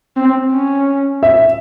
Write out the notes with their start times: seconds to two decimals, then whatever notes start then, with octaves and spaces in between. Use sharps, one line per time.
0.17 C4
0.52 C#4
1.23 E5